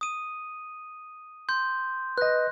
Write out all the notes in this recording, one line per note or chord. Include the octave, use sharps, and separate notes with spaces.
D#6 D#7
C6 G6
B4 D#5 F#6 A#6